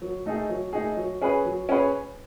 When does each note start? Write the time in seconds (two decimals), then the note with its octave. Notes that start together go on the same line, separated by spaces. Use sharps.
0.02 F#3
0.26 A3 D#4 G#4
0.49 F#3
0.73 A3 D#4 G#4
0.97 F#3
1.22 C#4 G#4 B4
1.45 F#3
1.69 C#4 G#4 B4